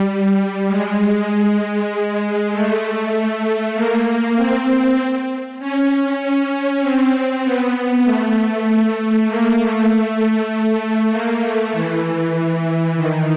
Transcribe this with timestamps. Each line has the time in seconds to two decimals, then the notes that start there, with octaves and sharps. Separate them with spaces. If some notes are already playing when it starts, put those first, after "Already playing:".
Already playing: G3
0.68 G#3
2.52 A3
3.74 A#3
4.36 C4
5.59 C#4
5.90 C#4
6.20 C#4
6.82 C4
7.43 B3
7.74 B3
8.04 A3
9.27 A#3
9.58 A3
9.89 A3
11.11 A#3
11.42 A3
11.73 E3
12.96 D#3